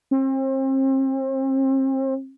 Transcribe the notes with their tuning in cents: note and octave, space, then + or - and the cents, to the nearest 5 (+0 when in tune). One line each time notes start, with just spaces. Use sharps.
C4 +35